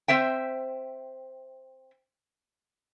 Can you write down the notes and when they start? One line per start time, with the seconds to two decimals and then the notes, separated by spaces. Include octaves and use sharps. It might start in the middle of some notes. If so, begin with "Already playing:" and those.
0.08 C4 C5 E5 G5